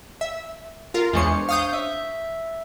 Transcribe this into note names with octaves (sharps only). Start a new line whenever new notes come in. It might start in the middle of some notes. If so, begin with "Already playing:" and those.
E5
F4 A#4
E2 G#3 D4 C5 C#5 C#7
F5 D#6 G6
E5